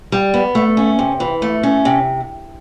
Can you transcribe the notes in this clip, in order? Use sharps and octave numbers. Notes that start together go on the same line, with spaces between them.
G3
B3
A3
C#4
C3
E3
A3
C#4
C3